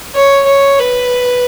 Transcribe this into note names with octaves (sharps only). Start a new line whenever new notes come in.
C#5
C#5
B4